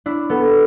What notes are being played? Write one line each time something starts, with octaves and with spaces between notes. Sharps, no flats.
D4 E4
B3 A4